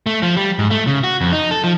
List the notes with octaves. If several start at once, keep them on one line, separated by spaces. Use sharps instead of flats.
A3
F3
G3
G#2
A3
C#3
F#4
F2
D#4
A4
F3